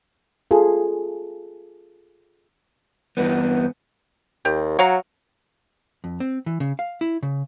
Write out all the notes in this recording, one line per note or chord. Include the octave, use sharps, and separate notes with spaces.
F4 G#4 A4
E2 G2 B3
D#2 G4
F#3 C#5 F5 A#5
F2
C4
E3
C#3
F5
E4
C#3